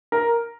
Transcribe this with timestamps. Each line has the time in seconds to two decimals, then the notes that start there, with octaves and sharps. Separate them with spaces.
0.12 A#4